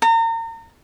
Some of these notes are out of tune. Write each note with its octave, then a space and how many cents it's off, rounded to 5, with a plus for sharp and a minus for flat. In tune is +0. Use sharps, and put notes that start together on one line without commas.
A#5 -35